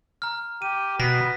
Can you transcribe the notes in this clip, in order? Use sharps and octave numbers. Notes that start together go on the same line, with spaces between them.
A#5 F6
G4 D#7
B2 B3 A#6 B6